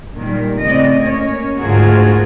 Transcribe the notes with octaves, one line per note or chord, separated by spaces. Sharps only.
A#2 D#3 G3
A2 C#3 C4 D5 D#5
A#3 C#4 C#5
D2 G#2 F4 F#4 G#4 A#4